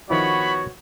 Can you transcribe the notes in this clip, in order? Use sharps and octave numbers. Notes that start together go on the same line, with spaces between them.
D#3 F3 B3 E4 F#4 C#5 B5